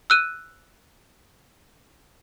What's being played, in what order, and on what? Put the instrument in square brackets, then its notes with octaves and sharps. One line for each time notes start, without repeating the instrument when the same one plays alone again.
[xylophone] E6 F#6 D#7